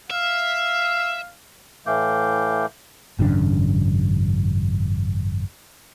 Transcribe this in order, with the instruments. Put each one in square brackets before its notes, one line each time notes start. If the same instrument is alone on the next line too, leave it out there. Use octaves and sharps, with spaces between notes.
[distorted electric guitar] E5 [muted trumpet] F5
[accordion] A2 E3 A3 F5 D6 G6
[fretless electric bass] G#1 F#2 C#3 D4